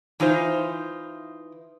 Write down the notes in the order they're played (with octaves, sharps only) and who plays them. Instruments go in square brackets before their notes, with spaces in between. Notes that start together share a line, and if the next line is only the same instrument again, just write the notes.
[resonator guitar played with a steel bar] E3 D#4 F4 C5